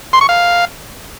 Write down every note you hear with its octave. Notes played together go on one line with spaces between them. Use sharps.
C6
C#6
F5